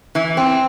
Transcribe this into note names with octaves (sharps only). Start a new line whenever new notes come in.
E3
C4